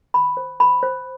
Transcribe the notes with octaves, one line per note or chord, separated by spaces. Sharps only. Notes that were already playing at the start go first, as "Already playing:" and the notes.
B5
C5
B5
C5